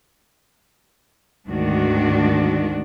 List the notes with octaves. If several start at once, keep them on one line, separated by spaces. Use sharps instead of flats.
D2 G#2 D#3 D4 F#4